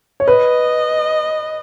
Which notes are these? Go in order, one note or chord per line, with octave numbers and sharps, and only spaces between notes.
C#5
B4 D#5